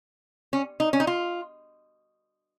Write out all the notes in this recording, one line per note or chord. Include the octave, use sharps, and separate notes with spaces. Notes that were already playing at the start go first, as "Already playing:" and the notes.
C#4
D#4
C#4
D#4
F4